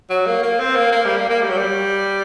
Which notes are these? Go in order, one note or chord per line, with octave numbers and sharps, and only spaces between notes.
F#3
A#3
A#3
C4
A#3
A#3
G3
A#3
A#3
G3
F#3
G3